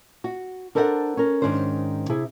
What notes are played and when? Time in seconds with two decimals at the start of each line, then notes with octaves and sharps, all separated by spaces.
0.24 F#4
0.75 D4 A4 A#4 C5 D#5 F#5
1.17 C#4 A#4
1.42 G#2 D#3 C#4 D4 C5
2.10 C3 E4 G#4